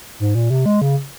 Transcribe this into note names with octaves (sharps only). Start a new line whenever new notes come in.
G#2
A#2
C3
G#3
C#3